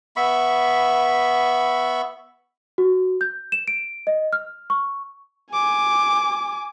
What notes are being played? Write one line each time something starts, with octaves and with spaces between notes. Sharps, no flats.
B3 E5 B5 C#6
F#4
G6
E7
D7
D#5
F6
C#6
G#5 D6